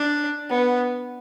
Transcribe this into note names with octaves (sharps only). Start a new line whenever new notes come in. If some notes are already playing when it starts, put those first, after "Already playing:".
Already playing: D4
B3